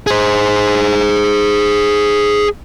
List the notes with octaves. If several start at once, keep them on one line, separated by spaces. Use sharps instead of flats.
G#4 C5